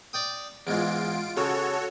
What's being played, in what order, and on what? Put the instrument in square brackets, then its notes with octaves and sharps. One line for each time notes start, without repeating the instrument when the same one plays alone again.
[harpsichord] D5 G5 D#6
[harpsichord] E2 G#2 [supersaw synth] F4 D7
[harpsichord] C#3 [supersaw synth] F#4 A4 C#5